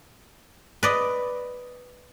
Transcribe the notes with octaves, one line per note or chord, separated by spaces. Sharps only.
B4 D5 D#5